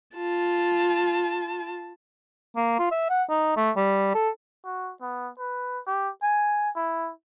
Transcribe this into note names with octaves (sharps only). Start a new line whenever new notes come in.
F4 A5
A#3
F4
E5
F#5
D#4
A3
G3
A4
F#4
B3
B4
G4
G#5
E4